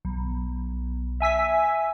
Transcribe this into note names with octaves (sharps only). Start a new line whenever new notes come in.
B1
E5 G#5 E6 B6